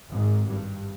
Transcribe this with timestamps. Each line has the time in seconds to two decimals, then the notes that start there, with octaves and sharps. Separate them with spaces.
0.10 G#1 G#2
0.46 G2